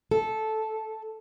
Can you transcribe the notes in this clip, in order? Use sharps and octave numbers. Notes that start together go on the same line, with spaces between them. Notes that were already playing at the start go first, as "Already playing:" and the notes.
A4